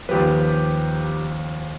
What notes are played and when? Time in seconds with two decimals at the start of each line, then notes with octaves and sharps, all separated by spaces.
0.09 D#2 F3 G4 B4